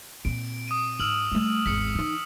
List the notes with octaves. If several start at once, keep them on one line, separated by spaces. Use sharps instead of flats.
A#2 C4 D7
D#6 D7 D#7
G#2 E6 F6 F#7
G3 A3
G#1 E2 B6 C#7
E3 D#4